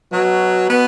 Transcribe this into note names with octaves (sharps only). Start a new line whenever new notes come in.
B2 F#3
B3